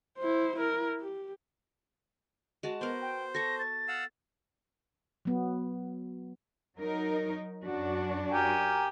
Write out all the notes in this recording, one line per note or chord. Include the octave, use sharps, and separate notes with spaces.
E4 C5
E4 A#4
G4
G#3 F#4 A5
B3 A#4 C5
G5
A4 C#6 A#6
A6
F5 F#5 E6
F#3 B3
F#3 D#4 A#4
F#2 D4 F#4
G4 A#4 G#5